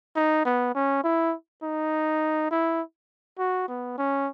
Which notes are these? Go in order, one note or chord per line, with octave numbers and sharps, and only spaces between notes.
D#4
B3
C#4
E4
D#4
E4
F#4
B3
C#4